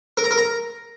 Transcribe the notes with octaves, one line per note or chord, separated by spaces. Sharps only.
A#4
A#5
A#4
A#5